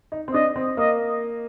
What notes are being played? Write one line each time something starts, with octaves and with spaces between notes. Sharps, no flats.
D#4
C4
D4 D#5
C4
A#3 D#5